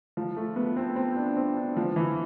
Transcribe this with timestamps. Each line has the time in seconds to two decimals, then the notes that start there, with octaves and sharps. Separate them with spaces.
0.17 F3
0.37 A3
0.56 B3
0.76 C4
0.96 C4
1.16 D4
1.37 C4
1.56 D4
1.77 F3
1.96 E3